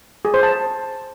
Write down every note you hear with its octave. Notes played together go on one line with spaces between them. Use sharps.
G#4
C5
A5